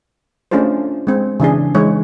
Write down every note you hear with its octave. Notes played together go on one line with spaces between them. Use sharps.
A3 C#4 D4 F4 G#4 C5
G#3 C4
C#3 E3 D4 G#4
E3 G#3 D#4 C#5